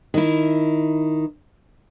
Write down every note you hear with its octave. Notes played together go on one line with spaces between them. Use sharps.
D#3 E4